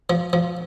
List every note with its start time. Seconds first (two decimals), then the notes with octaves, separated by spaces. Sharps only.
0.10 F3
0.33 F3